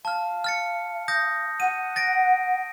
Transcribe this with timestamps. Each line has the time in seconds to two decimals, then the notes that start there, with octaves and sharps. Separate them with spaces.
0.05 F5 A5 F6
0.44 F6 A6 C#7
1.08 D#6 G6 A#6
1.60 F#5 D#7
1.96 A6 A#6 D7